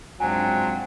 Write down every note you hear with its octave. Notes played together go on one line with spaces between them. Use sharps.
G#2 F3 F#3 C4 D4 G#5